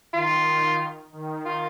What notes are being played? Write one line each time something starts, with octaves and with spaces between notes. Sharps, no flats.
D#3 F4
D#3
F4